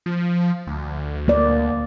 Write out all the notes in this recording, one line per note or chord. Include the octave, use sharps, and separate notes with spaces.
F3
D2
A#3 D5